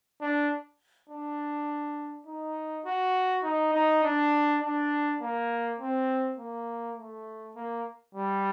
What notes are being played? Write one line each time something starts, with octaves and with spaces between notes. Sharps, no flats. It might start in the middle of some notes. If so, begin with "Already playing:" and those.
D4
D4
D#4
F#4
D#4
D#4
D4
D4
A#3
C4
A#3
A3
A#3
G3